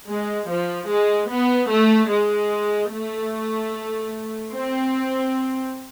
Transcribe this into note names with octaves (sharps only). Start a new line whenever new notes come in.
G#3
F3
G#3
B3
A3
G#3
A3
C4